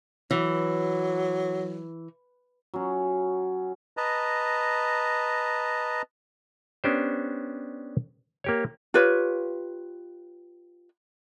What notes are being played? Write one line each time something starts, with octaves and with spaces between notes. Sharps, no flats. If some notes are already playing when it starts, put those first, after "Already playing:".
E3 F#3
F#3 C#4
B4 D#5 A5 A#5
B3 C#4 D4 G4 C5
A#3 G4 C#5
F4 G4 B4 C#5